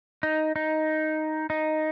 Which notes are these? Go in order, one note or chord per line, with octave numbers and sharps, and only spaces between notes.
D#4
D#4
D#4